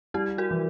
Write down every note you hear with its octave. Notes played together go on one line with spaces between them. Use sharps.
G3 E4 G4
F#4 A#4
E3